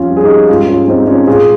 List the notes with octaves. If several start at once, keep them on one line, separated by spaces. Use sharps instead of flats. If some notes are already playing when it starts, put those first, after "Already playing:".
Already playing: F2 C#4 F4
G3 G4
G#4
D#4 G4
G#2 C#4 F4
C#4 F4
G#3 C4 D#4
C#4 F4
A#2 F4 G#4